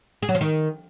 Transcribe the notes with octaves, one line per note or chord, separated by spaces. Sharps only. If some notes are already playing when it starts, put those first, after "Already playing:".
G#4
F#3
F3
D#3